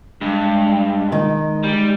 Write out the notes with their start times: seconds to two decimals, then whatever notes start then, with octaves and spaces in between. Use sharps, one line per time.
0.21 G2 G#3
1.12 D#3
1.64 G3